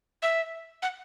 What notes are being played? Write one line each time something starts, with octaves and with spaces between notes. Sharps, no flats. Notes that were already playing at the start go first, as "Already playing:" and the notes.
E5
F#5